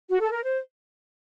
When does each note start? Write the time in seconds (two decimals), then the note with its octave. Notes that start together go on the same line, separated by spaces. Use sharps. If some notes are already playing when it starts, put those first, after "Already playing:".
0.09 F#4
0.21 A4
0.32 A#4
0.44 C5